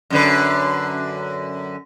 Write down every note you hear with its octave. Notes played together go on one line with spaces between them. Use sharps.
F#2 D3 B4